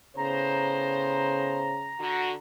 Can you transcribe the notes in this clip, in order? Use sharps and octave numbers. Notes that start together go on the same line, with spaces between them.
A2 C#3 B3 C5 A#5
D3 F#4